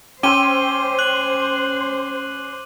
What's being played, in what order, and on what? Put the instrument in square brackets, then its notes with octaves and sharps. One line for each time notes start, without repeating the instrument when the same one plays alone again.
[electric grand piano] C#4 [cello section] C5 [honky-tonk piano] G5 C6 E6 [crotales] D6 D#7 G7
[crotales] F#6 F#7